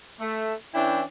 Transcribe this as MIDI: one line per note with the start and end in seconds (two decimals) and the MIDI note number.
0.20 0.54 57
0.74 1.02 52
0.74 1.02 61
0.74 1.02 62
0.74 1.02 64
0.74 1.02 79